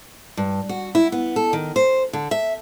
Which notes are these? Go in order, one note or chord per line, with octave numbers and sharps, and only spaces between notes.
G2
F#4
E4
B3
A4
D#3
C5
D3
E5